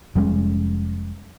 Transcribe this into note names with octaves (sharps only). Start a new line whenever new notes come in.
F1 G3 G#3 C#4